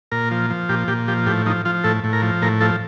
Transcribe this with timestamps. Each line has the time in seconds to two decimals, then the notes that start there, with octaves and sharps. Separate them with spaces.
0.12 A#2 A#4
0.31 F3
0.50 F3
0.69 A#2 G4
0.88 A#2 G4
1.08 F3 G4
1.26 A2 G4
1.46 F3 D#4
1.65 F3 F4
1.84 A2 A4
2.04 A2
2.13 A#4
2.22 F3
2.42 A2 A#4
2.61 F3 A4